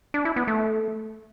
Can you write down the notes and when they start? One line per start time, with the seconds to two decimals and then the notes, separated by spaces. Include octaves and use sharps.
0.14 D4
0.25 E4
0.36 B3
0.48 A3